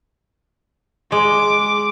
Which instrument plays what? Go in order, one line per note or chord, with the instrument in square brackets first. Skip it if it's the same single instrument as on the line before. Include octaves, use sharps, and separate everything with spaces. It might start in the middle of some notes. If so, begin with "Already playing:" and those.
[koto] G#3 [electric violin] D6